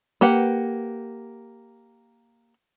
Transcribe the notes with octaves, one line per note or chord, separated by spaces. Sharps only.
A#3 G4 B4 F#5